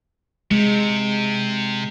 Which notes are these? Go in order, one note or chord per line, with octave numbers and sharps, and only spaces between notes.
C3 G#3